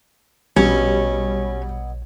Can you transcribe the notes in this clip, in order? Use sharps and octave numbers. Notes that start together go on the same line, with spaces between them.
A#1 B2 F#3 G3 C#4